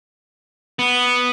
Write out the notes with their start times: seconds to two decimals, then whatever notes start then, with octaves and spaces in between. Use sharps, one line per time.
0.79 B3